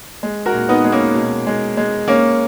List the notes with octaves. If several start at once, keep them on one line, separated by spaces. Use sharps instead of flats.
G#3
F#4 A#4
A#2
B3 D#4
G#3
A#3 C#4
B2
G#3
G#3
A#3 C#4